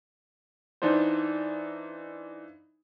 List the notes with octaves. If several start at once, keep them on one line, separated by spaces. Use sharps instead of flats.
E3 D4 D#4 F4 C5